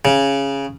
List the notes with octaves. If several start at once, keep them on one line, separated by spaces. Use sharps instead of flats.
C#3